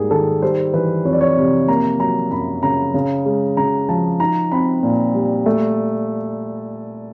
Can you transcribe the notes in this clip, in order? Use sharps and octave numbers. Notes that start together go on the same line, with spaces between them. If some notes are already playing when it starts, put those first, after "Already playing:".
Already playing: G#2 G3 A#3 G#4 A#4
D#3 A4
G3 C5
E3 B4
F2 C#5
D5
C#5
C3
A#3 A#5
F#3 A#5
F#2 B5
C#3 A#5
C#3
G#3
C#3 A#5
F3 A5
D#4 A#5
C4 B5
A#2
G3
A3